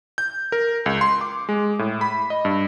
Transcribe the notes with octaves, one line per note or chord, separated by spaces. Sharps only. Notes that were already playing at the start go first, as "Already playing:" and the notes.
G6
A#4
C#2
C6
D6
G#3
A2
B5
D#5
G2